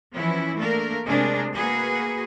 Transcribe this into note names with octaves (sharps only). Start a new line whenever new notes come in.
E3 F3 B3 C#4 E4
A3 A#3 D4 A#4
C3 G#3 A3 D4 G#4 A#4
A#3 F#4 G#4 B4